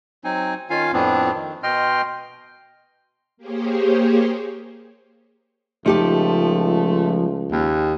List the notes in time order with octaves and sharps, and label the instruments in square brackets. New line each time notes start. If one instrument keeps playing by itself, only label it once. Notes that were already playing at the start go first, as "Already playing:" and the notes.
[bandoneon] F#3 C4 D#4 G#5
D#3 C#4 F4 F5 G#5
F2 A2 B3 C4 D4
D#3
B2 D#5 G5 C6 F6
[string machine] A#3 G4 G#4 C5 C#5
[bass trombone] C#2 [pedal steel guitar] F3 [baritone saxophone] A3 [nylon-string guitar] D#4 G4 A4
[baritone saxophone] D#2